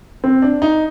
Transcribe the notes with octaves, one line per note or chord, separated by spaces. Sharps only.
C4
D4
D#4